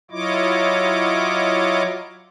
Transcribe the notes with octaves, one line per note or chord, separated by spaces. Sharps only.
F#3 E4 F4 C#5 D#5 D6